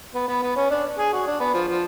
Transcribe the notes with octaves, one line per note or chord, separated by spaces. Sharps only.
B3
B3
B3
C#4
D4
G#4
F#4
D4
B3
F3
F3